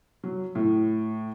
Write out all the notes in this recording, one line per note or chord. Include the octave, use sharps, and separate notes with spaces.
F#3
A2